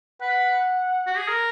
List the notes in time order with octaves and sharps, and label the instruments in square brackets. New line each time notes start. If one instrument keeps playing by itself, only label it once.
[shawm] B4 [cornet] F#5
[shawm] F#4
G#4
A#4